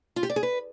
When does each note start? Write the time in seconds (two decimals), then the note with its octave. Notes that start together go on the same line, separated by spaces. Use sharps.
0.16 F4
0.23 G4
0.30 D5
0.36 G#4
0.43 B4